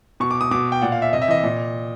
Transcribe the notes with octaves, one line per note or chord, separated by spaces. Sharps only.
B2 C#6
D6
D#6
B2 D6
G5
A#2 F#5
F5
E5
C3 D#5
E5
E3 D#5
A#2